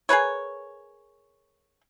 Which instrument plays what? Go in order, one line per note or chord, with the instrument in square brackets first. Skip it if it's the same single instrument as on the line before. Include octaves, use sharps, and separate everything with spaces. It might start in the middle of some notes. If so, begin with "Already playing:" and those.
[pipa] G#4 A#4 B4 C#5